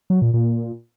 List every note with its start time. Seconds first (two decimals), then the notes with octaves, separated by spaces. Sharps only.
0.10 F#3
0.22 A#2
0.34 A#2